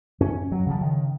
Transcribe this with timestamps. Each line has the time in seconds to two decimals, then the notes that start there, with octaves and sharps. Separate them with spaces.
0.21 F#2 C#4
0.52 F#3
0.66 C#3 F3
0.81 D#3